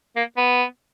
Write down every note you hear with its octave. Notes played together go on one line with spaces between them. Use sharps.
A#3
B3